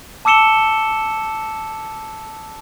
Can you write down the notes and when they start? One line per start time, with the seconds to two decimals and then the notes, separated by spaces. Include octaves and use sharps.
0.25 A5 D6 E6 C#7 E7 G7